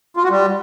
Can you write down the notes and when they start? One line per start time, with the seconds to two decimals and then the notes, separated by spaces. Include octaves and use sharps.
0.17 F4
0.24 F#4
0.31 G3